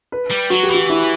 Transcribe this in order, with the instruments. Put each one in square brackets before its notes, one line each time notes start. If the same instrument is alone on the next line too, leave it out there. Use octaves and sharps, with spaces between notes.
[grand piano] B4
[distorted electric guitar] G3
[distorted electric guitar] F#3 [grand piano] F#4
[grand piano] G4
[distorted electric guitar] E3 [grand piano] F#4
[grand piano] E4